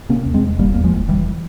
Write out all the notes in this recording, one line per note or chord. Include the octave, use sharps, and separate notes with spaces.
C3 A#3 C#4
E2
G#3 C4
E2
F1 G3 A#3
E2 A#3
F3 G#3
F1
E1 E3 G3